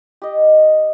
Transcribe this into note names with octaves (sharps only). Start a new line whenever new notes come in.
G4 D#5